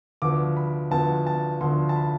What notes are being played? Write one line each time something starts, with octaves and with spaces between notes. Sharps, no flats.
D2 D3 F3 B3 D6
B5
D2 D3 F3 B3 A5
A5
D2 D3 F3 B3 C6
A5
B5